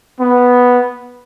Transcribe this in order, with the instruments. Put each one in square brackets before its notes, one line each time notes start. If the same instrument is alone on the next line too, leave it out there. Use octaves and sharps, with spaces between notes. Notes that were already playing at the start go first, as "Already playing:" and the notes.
[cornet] B3